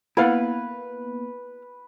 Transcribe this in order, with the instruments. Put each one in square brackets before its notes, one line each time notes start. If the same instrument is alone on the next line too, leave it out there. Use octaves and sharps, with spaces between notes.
[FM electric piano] A#3 B3 [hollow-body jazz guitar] E4 F5 F#5 [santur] B4